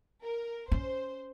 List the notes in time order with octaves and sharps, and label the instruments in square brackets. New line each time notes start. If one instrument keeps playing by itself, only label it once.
[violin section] A#4
[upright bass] C#4 [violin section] C5